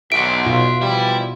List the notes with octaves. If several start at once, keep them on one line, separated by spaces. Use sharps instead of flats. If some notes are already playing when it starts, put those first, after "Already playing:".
B1 E5 F#5 D7
B2 F4
E3 F3 G3 E4